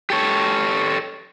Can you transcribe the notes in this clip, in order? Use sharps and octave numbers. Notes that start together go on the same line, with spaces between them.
G4 A4 C#5